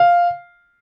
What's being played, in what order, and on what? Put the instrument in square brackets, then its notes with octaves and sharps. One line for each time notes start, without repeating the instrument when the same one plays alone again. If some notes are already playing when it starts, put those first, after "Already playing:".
Already playing: [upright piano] F5